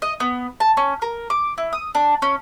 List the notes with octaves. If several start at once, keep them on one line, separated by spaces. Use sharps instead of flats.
D#5
B3
A5
C#4
A#4
D6
E4
D#6
D4
C#4